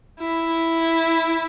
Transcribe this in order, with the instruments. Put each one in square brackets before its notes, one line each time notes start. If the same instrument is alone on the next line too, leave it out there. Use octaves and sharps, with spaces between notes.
[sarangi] E4